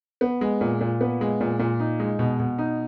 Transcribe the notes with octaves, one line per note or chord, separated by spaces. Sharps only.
B3
G#3
A#2
A#2
B3
G#3
A#2
A#2
D#4
G#3
B2
B2
D#4